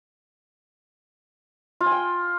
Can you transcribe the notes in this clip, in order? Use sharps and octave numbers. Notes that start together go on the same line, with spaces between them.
F4
G#5
G5